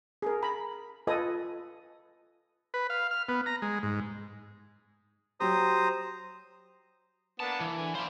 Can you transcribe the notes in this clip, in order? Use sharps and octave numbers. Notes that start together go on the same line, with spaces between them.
G#4 A#4
A#5 B5
F4 A4 B4 D#5 G#5 D#6
B4
F5
F6
B3
A#5
G#3
G#2
F#3 G4 C5 A#5 D#6
A#3 B3 D4 A5
E3
D3 G#5
D4 C5 F5 B5